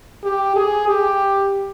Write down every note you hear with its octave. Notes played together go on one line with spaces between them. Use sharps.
G4
G#4
G4